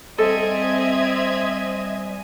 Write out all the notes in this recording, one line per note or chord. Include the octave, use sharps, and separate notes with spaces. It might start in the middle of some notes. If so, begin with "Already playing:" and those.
G3 C4 A4 D#5 E5 G#5 G#6